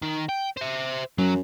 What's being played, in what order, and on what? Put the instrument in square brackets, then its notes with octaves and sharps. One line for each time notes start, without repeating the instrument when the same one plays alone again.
[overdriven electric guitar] D#3
G5
C5 E5
[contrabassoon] F#2 [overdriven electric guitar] F#3